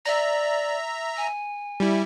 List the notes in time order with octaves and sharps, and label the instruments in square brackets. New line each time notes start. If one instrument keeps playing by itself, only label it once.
[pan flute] D5 [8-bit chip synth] E5 A#5
[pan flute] G#5
[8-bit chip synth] G3 E4